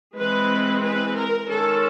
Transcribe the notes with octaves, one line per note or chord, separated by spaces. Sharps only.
E3 G#3 C4 B4
B4
A#4
D#3 G#3 C#4 A4